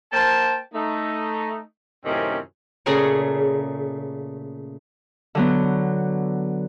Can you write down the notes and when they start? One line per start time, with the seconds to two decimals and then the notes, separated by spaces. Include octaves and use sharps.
0.11 A#3 C5 G5 A5
0.73 A3 D#4
2.04 F#2 A2 C3 D#3 C4 C#4
2.86 A#2 C#3 A3 G#4 A#4 C#5
5.35 D3 F#3 B3